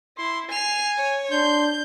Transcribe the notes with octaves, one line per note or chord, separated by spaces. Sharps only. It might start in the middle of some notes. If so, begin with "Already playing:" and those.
E4 C6
G#5 C7 F7
C#5
D4 C6 G6